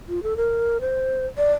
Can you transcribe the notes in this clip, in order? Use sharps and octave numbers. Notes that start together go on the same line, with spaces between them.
F4
A4
A#4
C5
D5